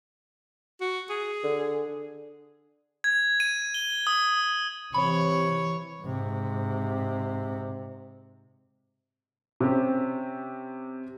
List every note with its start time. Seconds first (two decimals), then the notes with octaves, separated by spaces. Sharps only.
0.81 F#4
1.10 G#4
1.44 D3
3.04 G#6
3.40 D#7
3.74 G7
4.07 D#6
4.94 C3 E3 C#5 B5
6.02 G#2 C3
9.60 C3 C4 C#4 G4